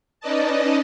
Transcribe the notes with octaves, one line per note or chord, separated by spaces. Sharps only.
C#4 D#4 B4 D5 D#5 A5